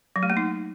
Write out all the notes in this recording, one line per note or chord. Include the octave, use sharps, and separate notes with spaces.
F#3
A3
A#3
D#4